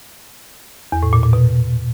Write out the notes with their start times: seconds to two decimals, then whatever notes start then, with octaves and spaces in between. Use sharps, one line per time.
0.92 E2
1.03 A2
1.13 A#2
1.23 A#2
1.33 B2